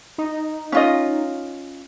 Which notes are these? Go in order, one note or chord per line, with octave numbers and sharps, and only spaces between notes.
D#4
C#4 F4 D#5